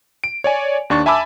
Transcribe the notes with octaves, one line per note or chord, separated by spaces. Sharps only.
D7
C#5 D5 G#5
D#2 D4 C#6 A6
E5 G#5 A5 B5 D6 E6